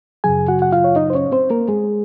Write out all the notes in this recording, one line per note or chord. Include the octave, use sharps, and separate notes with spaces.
F#2 C#3 F#3 G#4 G#5
F#4 F#5
F#5
F4 F5
C#5
D#4 D#5
C5
C#4 C#5
C4 C5
A#3 A#4
G#3 G#4